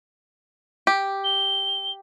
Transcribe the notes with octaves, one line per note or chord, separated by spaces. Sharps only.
G4
G7